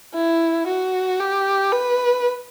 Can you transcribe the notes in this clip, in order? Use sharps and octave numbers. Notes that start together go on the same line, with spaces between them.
E4
F#4
G4
B4